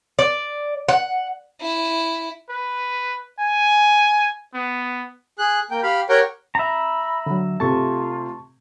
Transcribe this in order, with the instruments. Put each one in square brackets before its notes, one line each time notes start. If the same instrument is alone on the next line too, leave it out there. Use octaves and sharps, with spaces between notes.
[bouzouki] D5
F#5
[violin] E4
[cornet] B4
G#5
B3
[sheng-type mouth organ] G#4 F#6
A#3 G5
G4 F5 B5
G4 A#4 C#5 F#5 G5
[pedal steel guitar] E5 A#5 [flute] B5
[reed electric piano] D3 F#3
[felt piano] C3 A3 [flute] F4 [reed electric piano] A5 C#6